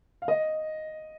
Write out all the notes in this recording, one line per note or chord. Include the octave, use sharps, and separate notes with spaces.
F5
D#5